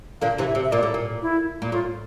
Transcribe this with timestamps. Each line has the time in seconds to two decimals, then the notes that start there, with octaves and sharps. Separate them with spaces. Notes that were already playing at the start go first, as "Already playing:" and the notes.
0.21 A#2 D3 F5
0.38 C3 E3
0.47 E5
0.55 C3
0.65 E5
0.72 A#2 D5
0.83 A2
0.94 A#2
1.22 E4
1.62 A#2
1.72 A2 F4